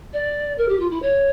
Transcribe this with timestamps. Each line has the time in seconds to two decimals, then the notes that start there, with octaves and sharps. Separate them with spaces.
0.13 D5
0.58 A#4
0.69 G4
0.80 F4
0.91 E4
1.02 C#5